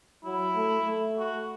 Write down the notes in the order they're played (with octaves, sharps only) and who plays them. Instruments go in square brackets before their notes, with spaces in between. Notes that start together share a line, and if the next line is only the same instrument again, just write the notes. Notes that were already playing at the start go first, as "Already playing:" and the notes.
[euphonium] F#3 [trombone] E4
[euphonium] A3
A3
[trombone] F#4